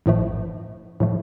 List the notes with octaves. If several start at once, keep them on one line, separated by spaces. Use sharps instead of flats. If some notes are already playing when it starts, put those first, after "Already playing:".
A1 A2 F3 A3
A2 F3 A3